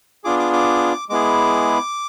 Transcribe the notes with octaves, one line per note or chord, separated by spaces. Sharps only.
B3 D4 F4 G#4 D6
D6
D6
G#3 B3 E4 G#4 D6